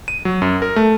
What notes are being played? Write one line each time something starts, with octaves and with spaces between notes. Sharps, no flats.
D#7
F#3
F#2
A#4
A3